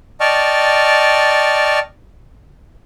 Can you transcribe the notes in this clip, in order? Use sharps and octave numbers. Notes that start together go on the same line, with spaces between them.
D5 D#5 G5 A5 C#6 F6